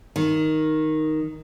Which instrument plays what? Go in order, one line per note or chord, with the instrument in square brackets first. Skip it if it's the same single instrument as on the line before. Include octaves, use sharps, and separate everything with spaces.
[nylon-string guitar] D#3